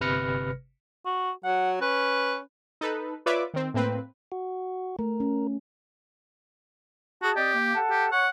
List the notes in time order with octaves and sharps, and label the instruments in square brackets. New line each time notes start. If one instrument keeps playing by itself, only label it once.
[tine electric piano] G1 C3 B4 F6 A#6 C#7
[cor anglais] F#4
[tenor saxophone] F#3 [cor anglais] F#5
[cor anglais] C#4 [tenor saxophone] B4
[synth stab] D#4 A4 B4
F4 B4 C#5 D5 E5 D6
D#3 C4
A2 A#3 C4 B4
[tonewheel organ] F#4
[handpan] A3 [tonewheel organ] A#4
[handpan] C#4
[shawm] F#4 [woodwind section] G#4 A5
[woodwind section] C4 D5 D#5 [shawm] G4
[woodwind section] A#3
A4 F#5 A5
[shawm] G4
[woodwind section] C#5 C#6 [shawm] F#5